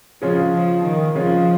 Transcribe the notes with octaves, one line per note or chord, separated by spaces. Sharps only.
C#3 F3 G#3 C#4 F4
F3
D#3
C#3 F3 G#3 C#4 F4